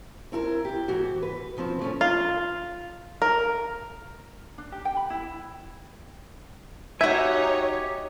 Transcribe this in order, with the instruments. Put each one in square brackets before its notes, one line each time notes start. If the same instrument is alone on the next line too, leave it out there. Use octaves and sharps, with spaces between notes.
[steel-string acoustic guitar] C4 E4 A4 A#4
G4
G#2 E3 F#4
B4
D#3 F3 C4
A2 A3 C#4
[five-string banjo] F4
A#4
[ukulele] D4
G4
G5
B5
E4
[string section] D#4 C#5 [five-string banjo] F#4 E5 [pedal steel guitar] G4 G5 G#5